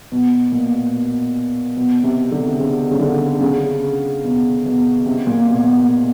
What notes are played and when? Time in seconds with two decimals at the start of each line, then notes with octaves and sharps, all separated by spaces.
0.12 B2
0.52 A#2
1.77 B2
2.03 C3
2.31 D3
2.59 C#3
2.91 C#3
2.99 D3
3.41 C#3
4.24 B2
4.66 B2
5.06 C3
5.27 A#2
5.47 B2
5.63 B2
5.69 A#2